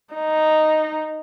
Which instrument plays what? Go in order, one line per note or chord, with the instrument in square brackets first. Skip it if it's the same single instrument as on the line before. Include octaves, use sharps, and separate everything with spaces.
[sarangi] D#4